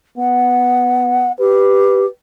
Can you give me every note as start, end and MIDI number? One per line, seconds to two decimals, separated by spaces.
0.17 1.31 59
0.17 1.32 78
1.39 2.06 67
1.39 2.07 71